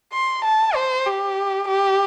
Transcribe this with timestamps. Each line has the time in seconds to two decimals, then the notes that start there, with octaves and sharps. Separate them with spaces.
0.13 C6
0.45 A5
0.75 C5
1.06 G4
1.68 G4